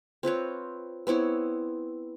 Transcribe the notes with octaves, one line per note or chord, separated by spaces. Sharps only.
C4 F4 B4 C#5
B3 C4 E4 C#5